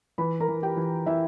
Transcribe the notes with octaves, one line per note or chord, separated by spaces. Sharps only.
E3 B4 B5
A#4 A#5
E3
G4 G5
E3
E3 E4 E5